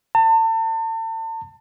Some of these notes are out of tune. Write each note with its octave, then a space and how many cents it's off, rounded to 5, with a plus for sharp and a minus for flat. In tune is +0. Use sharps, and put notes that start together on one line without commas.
A5 +35